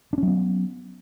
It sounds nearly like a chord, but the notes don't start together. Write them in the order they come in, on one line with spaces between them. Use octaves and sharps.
D4 C#4 F#3 B3